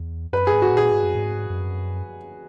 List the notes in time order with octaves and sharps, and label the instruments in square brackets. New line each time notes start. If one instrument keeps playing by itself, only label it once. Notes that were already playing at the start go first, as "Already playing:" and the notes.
Already playing: [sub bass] E2
[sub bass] F#2 [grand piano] B4
[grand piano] G#4
[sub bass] G#2
[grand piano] F#4
[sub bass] A#2 [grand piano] G#4
[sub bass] G#2
F#2
G#2
F#2